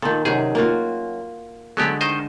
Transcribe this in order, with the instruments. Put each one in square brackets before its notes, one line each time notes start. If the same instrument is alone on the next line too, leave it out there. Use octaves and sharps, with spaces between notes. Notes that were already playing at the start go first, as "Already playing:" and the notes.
[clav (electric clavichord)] A#2 [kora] D#3 A4
[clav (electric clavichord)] F#2 G#4 [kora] C3 D#3
[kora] A#3 F4 F#4
[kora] D3 G#3 A4 [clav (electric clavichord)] F#3 B3 G4
[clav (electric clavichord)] D#3 C5 D#5